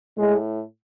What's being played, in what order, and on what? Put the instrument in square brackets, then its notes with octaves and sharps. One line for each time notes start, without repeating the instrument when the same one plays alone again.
[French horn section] A2 G#3